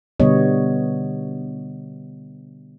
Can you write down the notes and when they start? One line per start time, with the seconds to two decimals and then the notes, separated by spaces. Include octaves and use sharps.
0.20 B2 D3 G3 B3 C#5 D#5